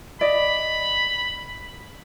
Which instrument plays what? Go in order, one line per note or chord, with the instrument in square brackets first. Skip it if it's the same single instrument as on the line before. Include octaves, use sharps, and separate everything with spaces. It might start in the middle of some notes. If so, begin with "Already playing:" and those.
[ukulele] D5 D#5 [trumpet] B5